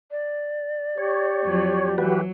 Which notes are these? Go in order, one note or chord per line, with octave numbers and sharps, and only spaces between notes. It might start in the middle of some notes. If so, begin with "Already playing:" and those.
D5
G4 C#5
F2 F3 F#3
E3 F#3 F#4 G4 B4